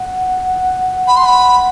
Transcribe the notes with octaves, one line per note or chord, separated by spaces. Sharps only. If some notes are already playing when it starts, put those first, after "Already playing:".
Already playing: F#5
F#5 B5
C6
B5